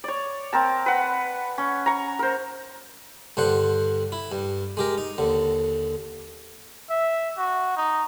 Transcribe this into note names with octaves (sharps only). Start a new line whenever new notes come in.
C#5 D5
C4 A#4 A5
B4 F#5
C#4
A#5 C#6
A#4 C5
G2 D3 C5 F#5
E4
G2
G#3 G4 A#4
D#4
D#2 D3
E5
F#4
D#4